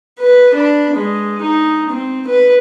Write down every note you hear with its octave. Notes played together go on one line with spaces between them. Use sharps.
B4
D4 B5
G#3
D#4
C4
B4